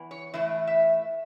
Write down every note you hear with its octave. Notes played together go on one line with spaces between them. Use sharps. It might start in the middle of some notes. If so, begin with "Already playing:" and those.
Already playing: E2 E3
C#5
A2 E3 E5
E5